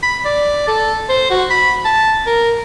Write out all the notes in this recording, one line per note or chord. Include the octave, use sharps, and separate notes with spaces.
B5
D5
A4
C5
F#4
B5
A5
A#4